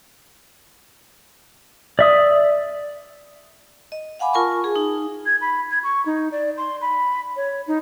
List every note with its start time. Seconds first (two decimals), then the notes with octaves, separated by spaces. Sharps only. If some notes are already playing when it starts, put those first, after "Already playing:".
1.99 D5 E5 D#6
3.92 D#5
4.19 F5 F#5 G#5 B5 D6
4.33 F4 A#4 G#5 A5 C#6
4.64 G#4
4.76 D#4
5.26 G#6
5.41 B5
5.71 G#6
5.83 C#6
6.06 D#4
6.32 D5
6.57 C6
6.81 B5
7.36 C#5
7.67 D#4